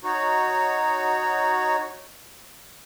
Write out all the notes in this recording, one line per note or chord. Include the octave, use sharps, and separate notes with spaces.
D#4 F#4 C#5